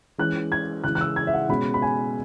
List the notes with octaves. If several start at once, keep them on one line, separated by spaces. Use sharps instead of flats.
E3 G#3 C#4 F#6
G#6
C#3 E3 G#3 F#6
F#6
E6
G#6
E5
F#5
B2 G#3 C#4 B5
B5
G#5